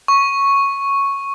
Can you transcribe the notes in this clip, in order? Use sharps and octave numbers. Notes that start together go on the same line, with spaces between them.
C#6